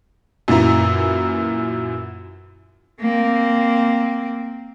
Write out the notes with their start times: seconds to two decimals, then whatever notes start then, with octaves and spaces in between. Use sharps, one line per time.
0.48 F#2 A#2 E3 E4 A#5
3.01 A#3 C4